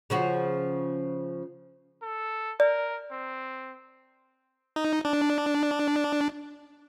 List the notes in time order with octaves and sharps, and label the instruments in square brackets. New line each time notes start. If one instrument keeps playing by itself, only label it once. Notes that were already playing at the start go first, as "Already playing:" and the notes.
[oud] C#3 F3 F#4
[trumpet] A4
[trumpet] A#4 [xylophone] D5
[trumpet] C4
[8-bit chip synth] D#4
D4